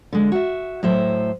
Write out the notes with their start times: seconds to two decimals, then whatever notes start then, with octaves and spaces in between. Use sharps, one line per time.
0.13 D3 G#3
0.32 F#4 E5
0.83 A2 F#3 C5 E5